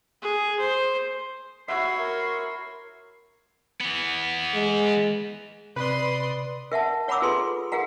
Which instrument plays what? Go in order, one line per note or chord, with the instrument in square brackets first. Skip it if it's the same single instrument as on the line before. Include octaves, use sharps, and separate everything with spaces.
[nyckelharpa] G#4
C5
[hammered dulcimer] E4 E5 [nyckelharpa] F#4 C#5 [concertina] F#5 [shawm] C6
[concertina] A#4
[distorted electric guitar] E3 B3
[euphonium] G#3
[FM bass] C3 [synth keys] B4 [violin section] D5 C6 D#6
[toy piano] A#4 E5 F#5 A5
C#5 F#5 A#5 B5 D6 E6
F4 G#4 A4 B4 C6
G#4 A#4 F5 F#5 A#5